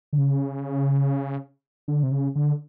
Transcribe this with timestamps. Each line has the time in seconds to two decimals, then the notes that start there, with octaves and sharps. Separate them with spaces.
0.13 D3
0.18 C#3
1.88 D3
2.03 C3
2.11 C#3
2.35 D3